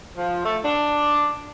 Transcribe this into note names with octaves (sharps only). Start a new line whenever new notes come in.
F3
A3
D4